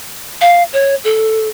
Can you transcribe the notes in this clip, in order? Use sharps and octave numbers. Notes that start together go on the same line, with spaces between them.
F5
C#5
A4